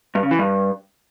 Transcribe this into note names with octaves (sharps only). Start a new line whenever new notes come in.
G2
C#3
E3
G2